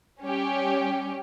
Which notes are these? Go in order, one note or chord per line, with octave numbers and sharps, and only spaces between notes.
G3 C#4 G4